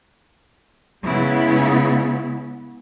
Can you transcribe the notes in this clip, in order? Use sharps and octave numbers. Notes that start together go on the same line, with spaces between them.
C#3 G#3 B3 E4